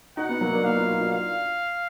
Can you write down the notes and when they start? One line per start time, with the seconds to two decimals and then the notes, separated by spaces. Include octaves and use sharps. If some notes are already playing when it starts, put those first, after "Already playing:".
0.17 D#4 F#4 F#5
0.29 B3 D#4
0.41 F#3 A#3
0.52 A#3 D4
0.64 B3 D#4 F5
0.76 D4 F4
0.88 D#4 F#4
1.00 D4 F4
1.12 F5